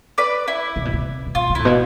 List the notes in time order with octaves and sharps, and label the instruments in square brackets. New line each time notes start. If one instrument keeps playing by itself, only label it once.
[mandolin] B4 D5
E4
[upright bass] C3
B2
C3
C3
[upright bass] B2 [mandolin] F4
[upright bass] C3
[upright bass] A2 [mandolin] E4
[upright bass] B2